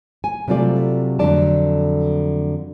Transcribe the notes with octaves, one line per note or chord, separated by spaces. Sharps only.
G#5
C3 F#3 G3 A3 F4 D5
F2 D3 F#3 A3 D5 A5